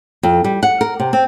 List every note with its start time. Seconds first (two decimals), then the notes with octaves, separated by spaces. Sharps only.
0.23 F2
0.44 G3
0.63 F#5
0.81 A#4
1.00 C3
1.13 C4